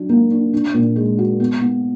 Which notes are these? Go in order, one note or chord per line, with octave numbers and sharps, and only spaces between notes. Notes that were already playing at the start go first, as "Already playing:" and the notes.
Already playing: F#3 D4
A#3
D4
D4
A#2
G#3
F#4
B3
B3